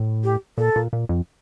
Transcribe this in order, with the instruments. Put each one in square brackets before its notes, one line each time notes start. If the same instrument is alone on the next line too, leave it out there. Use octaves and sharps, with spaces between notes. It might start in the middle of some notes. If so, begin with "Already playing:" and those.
Already playing: [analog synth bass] A2
[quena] G4
[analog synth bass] A#2 [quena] A4
[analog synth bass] A#2
A#2
F2